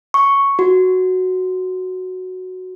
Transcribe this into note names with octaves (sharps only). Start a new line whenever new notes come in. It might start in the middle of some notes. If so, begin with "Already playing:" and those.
C#6
F#4